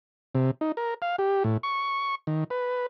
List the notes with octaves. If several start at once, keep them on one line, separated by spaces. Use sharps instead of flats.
C3
D#4
A#4
F5
G4
A2
C#6
D#3
B4